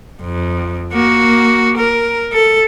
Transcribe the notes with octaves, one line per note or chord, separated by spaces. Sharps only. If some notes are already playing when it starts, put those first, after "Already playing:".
F2
A#3 F#4
A#4
A4